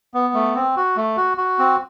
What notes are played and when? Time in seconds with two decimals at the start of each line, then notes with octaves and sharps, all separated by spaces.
0.14 B3
0.34 A3
0.55 C4
0.77 F#4
0.97 A3
1.17 F#4
1.38 F#4
1.59 C4